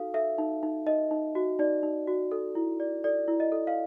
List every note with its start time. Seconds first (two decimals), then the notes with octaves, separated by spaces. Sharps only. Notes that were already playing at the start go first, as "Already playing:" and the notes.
Already playing: D#4 F#4 A4 F5
0.14 A4 E5
0.38 D#4
0.63 D#4
0.86 D#4 D#5
1.11 D#4
1.35 F#4
1.59 D#4 D5
1.83 D#4
2.07 F#4
2.32 A4
2.55 E4
2.80 D5
3.04 A4 D5
3.28 E4
3.40 D#5
3.52 A4
3.67 F5